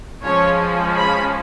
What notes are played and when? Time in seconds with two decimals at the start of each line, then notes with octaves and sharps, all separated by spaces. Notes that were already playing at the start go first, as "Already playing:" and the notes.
0.24 F3 G#3 C#4 C#5
0.98 B5